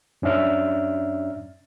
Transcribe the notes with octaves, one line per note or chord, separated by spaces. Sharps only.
F#2 C#4 D4 E5 F6